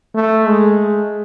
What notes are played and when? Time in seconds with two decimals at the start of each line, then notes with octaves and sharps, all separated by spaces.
0.15 A3
0.47 G#3